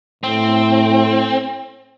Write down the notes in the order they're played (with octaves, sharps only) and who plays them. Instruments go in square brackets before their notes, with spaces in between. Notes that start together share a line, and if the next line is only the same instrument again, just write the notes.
[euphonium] A2 [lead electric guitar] C4